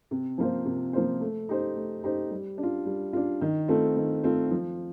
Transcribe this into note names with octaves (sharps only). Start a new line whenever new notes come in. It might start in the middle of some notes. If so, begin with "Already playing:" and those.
C3
F3 A#3 F4 C5
C3
F3 A#3 F4 C5
A3
D#4 G4 C5
A3
D#4 G4 C5
G3
D4
F4
G3
D4 F4
D#3
A3 C4 F4 A4
D#3
A3 C4 F4 A4
F3